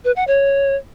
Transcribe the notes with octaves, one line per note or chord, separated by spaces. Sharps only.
B4
F#5
C#5